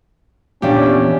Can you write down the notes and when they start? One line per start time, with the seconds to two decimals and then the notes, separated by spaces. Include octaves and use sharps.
0.62 E2 A#2 C#4 D4 G4